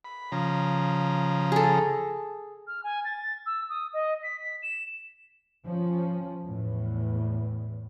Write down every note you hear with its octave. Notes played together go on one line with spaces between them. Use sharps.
B5
C#3 F3 A#5
G#4 A4
F6
G#5
A6
E6
D#6
D#5
B6
B6
E7
F3 C#4
E2 A2